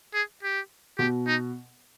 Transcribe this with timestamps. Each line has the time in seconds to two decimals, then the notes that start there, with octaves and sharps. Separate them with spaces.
0.14 G#4
0.43 G4
0.98 B2 G4
1.27 D#4